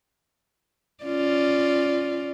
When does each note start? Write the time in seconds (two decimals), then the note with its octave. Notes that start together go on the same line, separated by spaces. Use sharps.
1.04 C#4 F4 D5